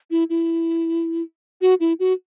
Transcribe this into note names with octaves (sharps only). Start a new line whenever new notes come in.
E4
E4
F#4
E4
F#4